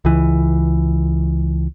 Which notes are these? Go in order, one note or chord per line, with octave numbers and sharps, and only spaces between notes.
C#2 E3